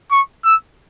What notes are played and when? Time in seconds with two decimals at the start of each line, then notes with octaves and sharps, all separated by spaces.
0.11 C#6
0.45 E6